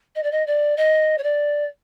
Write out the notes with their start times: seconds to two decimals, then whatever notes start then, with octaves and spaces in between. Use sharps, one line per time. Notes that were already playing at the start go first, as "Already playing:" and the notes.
0.15 D#5
0.23 D5
0.32 D#5
0.47 D5
0.77 D#5
1.18 C#5
1.23 D5